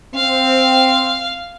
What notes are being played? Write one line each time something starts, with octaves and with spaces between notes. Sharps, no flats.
C4 F5